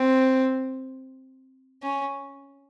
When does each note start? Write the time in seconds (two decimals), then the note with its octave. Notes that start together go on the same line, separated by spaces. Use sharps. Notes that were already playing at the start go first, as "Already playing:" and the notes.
Already playing: C4
1.83 C#4